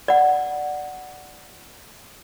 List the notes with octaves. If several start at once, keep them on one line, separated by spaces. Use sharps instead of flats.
D5 F#5